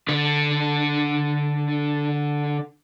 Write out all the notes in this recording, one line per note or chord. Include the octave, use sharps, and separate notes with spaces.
D3 D4